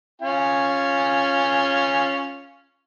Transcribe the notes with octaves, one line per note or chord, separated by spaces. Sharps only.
C#4 F4 G#5